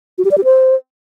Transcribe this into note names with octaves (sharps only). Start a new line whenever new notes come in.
F#4
G4
D5
G4
C5